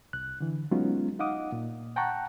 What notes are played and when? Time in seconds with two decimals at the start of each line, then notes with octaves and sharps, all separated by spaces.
0.13 C2 F#6
0.41 D3 E3
0.71 F#3 G#3 B3 C#4 D#4 F4
1.19 D#4 D#5 F5 F#5 D6 D#6
1.52 A#2
1.96 F#5 G5 A5 A#5 C#6 F#6